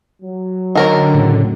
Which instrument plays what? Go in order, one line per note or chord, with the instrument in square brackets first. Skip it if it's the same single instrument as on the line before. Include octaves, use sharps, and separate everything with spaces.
[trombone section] F#3
[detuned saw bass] D3 [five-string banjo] D#3 A#4 C#5
[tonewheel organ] A2 C#3